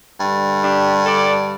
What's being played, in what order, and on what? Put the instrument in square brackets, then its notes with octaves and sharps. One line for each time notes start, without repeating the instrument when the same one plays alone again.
[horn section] G2 D3
D4 G4
A4 D5